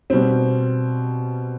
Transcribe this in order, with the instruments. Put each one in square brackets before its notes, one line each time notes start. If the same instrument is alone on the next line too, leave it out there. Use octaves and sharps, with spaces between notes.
[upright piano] B2 G3 C4